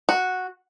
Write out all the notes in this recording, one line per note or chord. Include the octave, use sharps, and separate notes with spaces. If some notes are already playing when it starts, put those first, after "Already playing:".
F#4